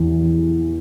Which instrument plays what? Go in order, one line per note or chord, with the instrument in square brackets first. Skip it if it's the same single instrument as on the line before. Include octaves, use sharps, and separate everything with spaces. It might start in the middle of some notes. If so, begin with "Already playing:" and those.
Already playing: [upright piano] E2 E3